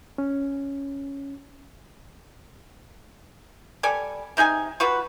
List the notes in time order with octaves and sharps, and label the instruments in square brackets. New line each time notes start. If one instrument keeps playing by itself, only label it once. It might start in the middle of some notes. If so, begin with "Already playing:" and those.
[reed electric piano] C#4
[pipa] G3 A4 D5 G#5
C3 D#4 G#4 G#5
F4 F#4 B4